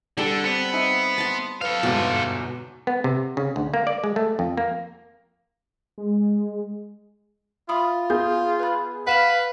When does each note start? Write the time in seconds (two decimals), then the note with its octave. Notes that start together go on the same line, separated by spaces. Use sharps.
0.17 D3 G3 A4
0.44 B3 C4
0.73 C4 D#4 E5
1.18 A5 C6
1.61 A4 B4 F5
1.83 G1 E2 G#2 B2 C6
2.87 B3
3.04 C3
3.37 C#3
3.56 D2
3.74 A#3
3.87 D5
4.04 G#3
4.16 A3
4.39 F2
4.57 A#3
5.98 G#3
7.69 F4 E5 B5 D#6
8.10 B3 G#4 D#6 G6
8.60 B4 B5
9.07 B4 F5 F#5 B5 E7 F#7